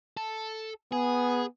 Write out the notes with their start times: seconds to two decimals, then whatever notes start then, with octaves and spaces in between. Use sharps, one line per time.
0.17 A4
0.92 B3 G#4